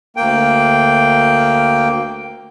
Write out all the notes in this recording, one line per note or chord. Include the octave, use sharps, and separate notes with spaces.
D2 A#3 G5